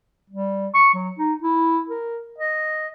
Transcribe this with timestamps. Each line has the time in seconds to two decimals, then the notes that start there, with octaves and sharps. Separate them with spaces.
0.30 G3
0.74 C#6
0.94 F#3
1.18 D#4
1.42 E4
1.89 A#4
2.38 D#5